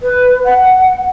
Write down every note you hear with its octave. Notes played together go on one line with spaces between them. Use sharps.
B4
F#5